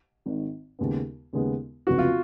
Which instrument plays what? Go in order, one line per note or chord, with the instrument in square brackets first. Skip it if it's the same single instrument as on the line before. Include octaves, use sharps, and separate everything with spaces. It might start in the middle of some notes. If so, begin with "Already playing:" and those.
[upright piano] G#1 G#2 D#3
D#2 C#3 G#3 B3
D#2 C#3 G#3 B3
[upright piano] F1 F2 C#3 F#3 B3 [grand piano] F#4
[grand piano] F4